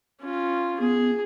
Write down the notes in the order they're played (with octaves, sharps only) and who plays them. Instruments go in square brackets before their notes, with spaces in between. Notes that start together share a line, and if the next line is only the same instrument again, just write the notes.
[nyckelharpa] C#4 F4
[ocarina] B3 [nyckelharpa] G#4